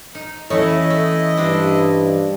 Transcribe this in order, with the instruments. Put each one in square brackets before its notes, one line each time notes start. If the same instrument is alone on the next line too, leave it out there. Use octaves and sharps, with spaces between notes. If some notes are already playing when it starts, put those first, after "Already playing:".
[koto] D#4
[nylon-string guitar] E3 C#4 C#5 [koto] A3 [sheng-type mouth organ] E4 D#5
[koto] A3
[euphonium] G2 [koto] C4 D4